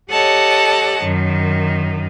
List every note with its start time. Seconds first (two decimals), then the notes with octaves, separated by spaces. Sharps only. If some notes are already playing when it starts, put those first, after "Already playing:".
0.10 G4 A4 C#5 D#5 F#5 A5
1.02 F#2 D#3